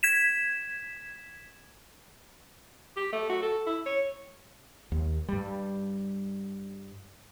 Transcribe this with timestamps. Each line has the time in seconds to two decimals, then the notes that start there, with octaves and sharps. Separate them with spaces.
0.03 G#6 B6 E7
2.97 G4
3.13 A3
3.30 F#4
3.42 A4
3.67 E4
3.86 C#5
4.92 D#2
5.28 G2 G3